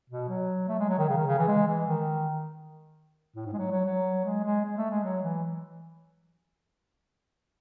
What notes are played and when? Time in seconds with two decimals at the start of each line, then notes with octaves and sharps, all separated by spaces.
0.10 B2
0.29 F#3
0.68 A3
0.79 G#3
0.89 F#3
0.98 D#3
1.09 C#3
1.18 D#3
1.27 C#3
1.38 E3
1.48 G#3
1.67 E3
1.87 D#3
3.36 A2
3.46 G#2
3.53 G#3
3.58 F#3
3.71 F#3
3.85 F#3
4.25 G#3
4.44 G#3
4.65 G#3
4.77 A3
4.90 G#3
5.04 F#3
5.23 E3